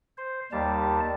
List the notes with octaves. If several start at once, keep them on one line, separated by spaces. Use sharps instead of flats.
C5
D#2 G3 A5